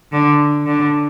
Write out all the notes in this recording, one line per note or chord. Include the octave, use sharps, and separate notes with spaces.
D3
D3